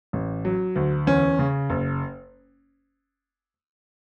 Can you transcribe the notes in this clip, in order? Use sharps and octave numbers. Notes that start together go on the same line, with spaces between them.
A1
F#3
D2
E2 C#4
C#3
F#1